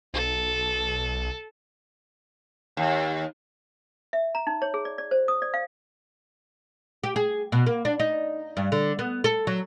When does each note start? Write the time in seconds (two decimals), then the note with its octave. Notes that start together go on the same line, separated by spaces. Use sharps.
0.14 B1 A4
2.77 D#2
4.13 E5
4.35 A#5
4.47 D#4
4.62 C#5
4.74 G#4
4.85 D5
4.98 D5
5.11 C5
5.28 D#6
5.42 D5
5.54 F5
7.04 G4
7.16 G#4
7.52 B2
7.66 A#3
7.85 D4
8.00 D#4
8.57 G2
8.72 D3
8.99 B3
9.24 A4
9.47 F#3